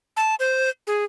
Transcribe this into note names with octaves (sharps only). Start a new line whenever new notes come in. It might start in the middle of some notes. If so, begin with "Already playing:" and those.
A5
C5
G#4